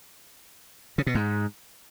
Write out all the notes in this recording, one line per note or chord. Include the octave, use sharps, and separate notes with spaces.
C#3
B2
G#2